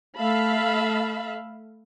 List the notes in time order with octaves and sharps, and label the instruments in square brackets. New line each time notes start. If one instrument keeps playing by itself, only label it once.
[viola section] A3 E5 F5 A5 B5